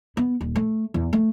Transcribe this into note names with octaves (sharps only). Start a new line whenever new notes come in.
B3
D#1
A3
E2
A3